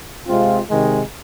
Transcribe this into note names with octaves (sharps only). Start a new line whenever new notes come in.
C3 G#3 C4 F4
C3 D#3 G#3